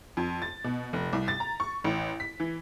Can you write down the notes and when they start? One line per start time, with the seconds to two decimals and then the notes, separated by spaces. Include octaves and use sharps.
0.17 F2
0.42 A6
0.64 B2
0.93 F1
1.13 C2
1.28 A6
1.40 A#5
1.60 C#6
1.84 A1
2.20 B6
2.40 E3